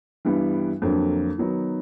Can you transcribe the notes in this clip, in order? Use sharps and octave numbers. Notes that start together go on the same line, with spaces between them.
G2 E3 G3 B3
F2 D3 F#3 A#3 D4
D#3 F#3 B3 D#4